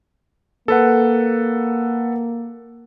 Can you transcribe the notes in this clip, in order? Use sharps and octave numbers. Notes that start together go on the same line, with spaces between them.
A#3 A4 B4 F#5